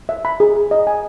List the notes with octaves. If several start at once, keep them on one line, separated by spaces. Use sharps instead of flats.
E5
B5
G#4
G#4
D#5
G#5